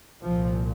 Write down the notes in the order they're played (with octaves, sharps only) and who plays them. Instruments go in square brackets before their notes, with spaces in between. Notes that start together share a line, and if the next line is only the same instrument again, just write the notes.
[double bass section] C2 A#2 F3